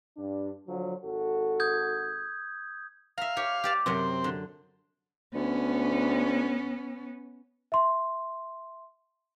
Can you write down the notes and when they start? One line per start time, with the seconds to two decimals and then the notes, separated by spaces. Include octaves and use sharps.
0.17 G2 D4
0.68 D3 F3 F#3
1.04 G#1 F#4 A4
1.60 D#6 G6 G#6
3.18 E5 F5 A#5
3.37 G4 C#5
3.64 G4 D5 A5
3.86 F#2 C3 F#3 C4
4.24 D3
5.35 D2 B3 C#4
7.72 E5 C6